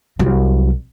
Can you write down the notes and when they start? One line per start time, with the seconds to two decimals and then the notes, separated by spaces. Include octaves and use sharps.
0.19 C2 F#3